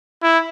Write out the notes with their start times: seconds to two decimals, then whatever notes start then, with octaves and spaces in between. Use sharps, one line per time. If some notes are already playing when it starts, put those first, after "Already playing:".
0.23 E4